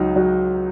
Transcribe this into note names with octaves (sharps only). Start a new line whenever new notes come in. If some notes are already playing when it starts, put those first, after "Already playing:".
Already playing: C#2 F#3 D#4
F#3